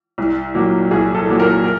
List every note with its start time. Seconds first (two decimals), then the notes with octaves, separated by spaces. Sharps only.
0.18 C2
0.55 A#2 F#3 A#3
0.91 C2 G#4
1.15 A4
1.27 A#2 F#3 A#3
1.40 A#4
1.64 A#4